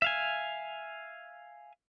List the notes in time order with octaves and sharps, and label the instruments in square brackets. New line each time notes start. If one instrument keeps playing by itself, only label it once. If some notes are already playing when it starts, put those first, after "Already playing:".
[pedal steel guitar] E5 F5 G#5